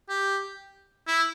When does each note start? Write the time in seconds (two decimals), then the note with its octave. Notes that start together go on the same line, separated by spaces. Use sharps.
0.09 G4
1.07 E4